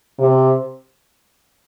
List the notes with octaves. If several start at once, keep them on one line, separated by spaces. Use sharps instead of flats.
C3